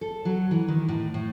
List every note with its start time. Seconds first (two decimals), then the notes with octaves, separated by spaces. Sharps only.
0.01 A4
0.25 F#3
0.51 E3
0.68 D#3
0.88 A2
1.14 A2